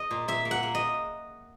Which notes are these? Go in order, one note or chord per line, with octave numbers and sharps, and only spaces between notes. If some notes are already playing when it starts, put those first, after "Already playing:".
Already playing: D#5
A#2
A#2 E5
A#3
F#5
A#3
D#5